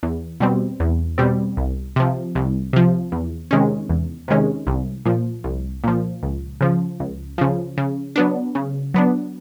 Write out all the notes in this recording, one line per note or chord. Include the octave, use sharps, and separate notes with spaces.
E2
B2 G3 C4
E2
B2 G3 C4
C2
C3 F3
C2
C3 F3
E2
C3 D#3 G#3 C#4
E2
C3 D#3 G#3 C#4
C2
A#2 F3
C2
A#2 F3
C#2
C#3 F3
C#2
C#3 F3
C#3
F#3 B3 D4
C#3
F#3 B3 D4